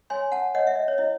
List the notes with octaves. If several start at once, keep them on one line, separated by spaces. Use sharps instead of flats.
C#5 G#5 C6
F#5 A5
C#5 D#5 F#5
E5
D#5
C#5
E4 D#5